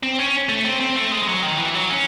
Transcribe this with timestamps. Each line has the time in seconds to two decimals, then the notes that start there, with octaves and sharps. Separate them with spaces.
0.03 C4
0.19 C#4
0.49 A3
0.65 C4
0.81 C4
0.96 A3
1.12 G#3
1.23 G#3
1.27 F#3
1.43 D#3
1.58 E3
1.74 F#3
1.89 C#4